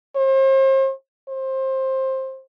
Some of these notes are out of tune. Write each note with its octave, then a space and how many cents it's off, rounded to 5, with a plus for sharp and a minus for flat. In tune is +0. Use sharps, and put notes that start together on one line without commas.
C5 +40
C5 +20